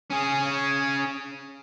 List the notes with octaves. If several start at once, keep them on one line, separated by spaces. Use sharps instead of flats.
C#4 G#4